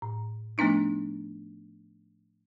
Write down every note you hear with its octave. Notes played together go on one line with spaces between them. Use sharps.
A2
F3 A3 B3 D4 D#4